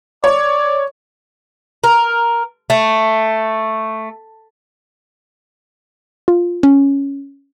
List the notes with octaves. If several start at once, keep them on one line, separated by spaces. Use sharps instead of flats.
C#5 D5
A#4
A3
F4
C#4